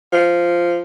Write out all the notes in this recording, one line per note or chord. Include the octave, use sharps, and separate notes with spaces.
F3